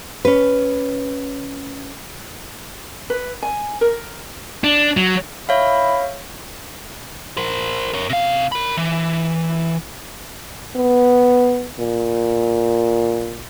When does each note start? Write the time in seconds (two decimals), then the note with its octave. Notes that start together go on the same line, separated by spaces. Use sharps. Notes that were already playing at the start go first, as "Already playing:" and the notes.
0.25 C#4 B4
3.10 B4
3.42 G#5
3.81 A#4
4.64 D4
4.97 F#3
5.49 E4 C#5 E5 F5
7.37 A#4 C5
7.94 A#4 C#5
8.10 C3 F5
8.52 A#4 B5
8.77 E3
10.76 B3
11.79 A#2